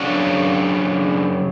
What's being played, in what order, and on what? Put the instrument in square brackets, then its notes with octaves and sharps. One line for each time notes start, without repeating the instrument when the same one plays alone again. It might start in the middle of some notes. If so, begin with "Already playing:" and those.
Already playing: [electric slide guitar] C#3 F#3 D4 F#4